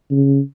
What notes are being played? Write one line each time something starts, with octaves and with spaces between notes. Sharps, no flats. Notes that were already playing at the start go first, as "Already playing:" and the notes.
C#3